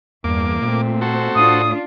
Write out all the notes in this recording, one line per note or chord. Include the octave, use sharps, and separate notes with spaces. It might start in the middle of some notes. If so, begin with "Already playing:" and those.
E2 G2 A#3 D6
A#2 A3 C4
F#4 A4 C5
A2 D4 F4 D#6